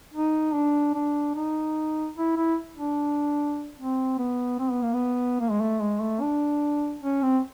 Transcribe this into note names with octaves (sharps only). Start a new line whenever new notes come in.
D#4
D4
D4
D#4
E4
E4
D4
C4
B3
C4
B3
A#3
B3
A#3
G#3
A3
G#3
A3
D4
C#4
C4